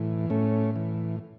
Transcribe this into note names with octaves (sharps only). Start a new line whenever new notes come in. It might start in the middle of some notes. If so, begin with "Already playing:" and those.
Already playing: A2 E3
A2 A3 C#4
E3